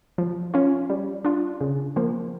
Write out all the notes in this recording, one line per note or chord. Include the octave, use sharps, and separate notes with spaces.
F3
C#4 F4
G3
D4 F4
C#3
F3 A#3